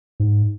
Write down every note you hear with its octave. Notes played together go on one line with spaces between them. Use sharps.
G#2